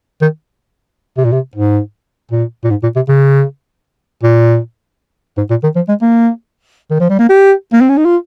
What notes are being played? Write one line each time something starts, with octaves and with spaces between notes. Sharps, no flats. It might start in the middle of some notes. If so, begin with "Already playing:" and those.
D#3
C3
A#2
C3
G#2
A#2
A#2
G#2
A#2
C3
C#3
A#2
G#2
A#2
D#3
F3
G#3
A#3
D#3
F3
G3
A#3
G4
A#3
C4
C#4
D#4
F4